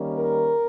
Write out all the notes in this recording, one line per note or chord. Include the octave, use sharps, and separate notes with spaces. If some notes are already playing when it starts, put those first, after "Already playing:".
Already playing: D#3 G3 A#3 C#4
A#4